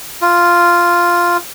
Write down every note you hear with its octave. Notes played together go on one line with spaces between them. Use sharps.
F4